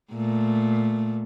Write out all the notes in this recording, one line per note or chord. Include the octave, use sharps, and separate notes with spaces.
A#2 A3